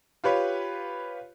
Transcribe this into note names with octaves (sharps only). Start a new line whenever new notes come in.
F4 G4 B4 C#5